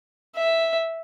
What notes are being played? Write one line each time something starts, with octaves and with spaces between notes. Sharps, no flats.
E5